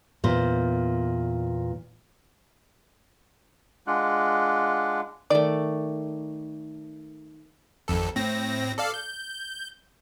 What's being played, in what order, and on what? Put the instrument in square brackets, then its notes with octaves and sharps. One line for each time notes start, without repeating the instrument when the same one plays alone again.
[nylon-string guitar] E2 A#2 C5
[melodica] G#3 D4 F4 F#5
[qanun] D#3 A3 [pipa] D5
[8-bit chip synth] G#1 F2 A4
A2 C4 A#6
A4 D5 F5
G6